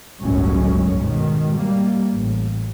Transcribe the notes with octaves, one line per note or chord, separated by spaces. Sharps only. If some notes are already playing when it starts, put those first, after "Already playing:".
G1 C#2 F#2 A2 G#3 C#4
G#2 B2 D#3
G3 A#3
A1